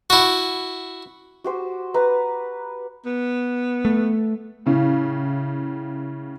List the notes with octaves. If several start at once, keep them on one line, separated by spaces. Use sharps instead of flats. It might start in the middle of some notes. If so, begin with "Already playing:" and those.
E4 F#4
F#4 G4 C5
B4 A#5
B3
A3
A2 C#3